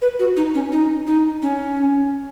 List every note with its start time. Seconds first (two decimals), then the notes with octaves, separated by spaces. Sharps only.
0.02 B4
0.19 F#4
0.37 D#4
0.55 C#4
0.72 D#4
1.07 D#4
1.42 C#4